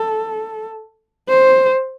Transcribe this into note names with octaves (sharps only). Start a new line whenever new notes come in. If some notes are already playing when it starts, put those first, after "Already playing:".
Already playing: A4
C5